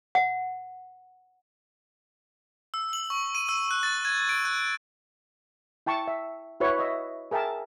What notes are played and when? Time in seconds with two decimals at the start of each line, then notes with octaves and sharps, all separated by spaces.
0.15 F#5
2.74 E6
2.93 F#7
3.10 C#6
3.35 D#7
3.49 E6
3.71 F#6
3.83 A6
4.05 G#6
4.29 D7
4.45 F#6
5.86 E4 G5 A5 C#6
6.08 E5
6.60 E4 F#4 B4 C#5 C#6
6.79 D#5 E5
7.31 G#4 A#4 E5 G5 A5